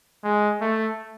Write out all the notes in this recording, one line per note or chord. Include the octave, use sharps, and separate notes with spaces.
G#3
A3